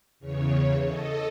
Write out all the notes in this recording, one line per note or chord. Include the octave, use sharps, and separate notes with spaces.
E2 C#3 C#5
A4 D#5